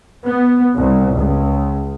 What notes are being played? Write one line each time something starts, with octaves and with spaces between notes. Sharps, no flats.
B3
C2
C#2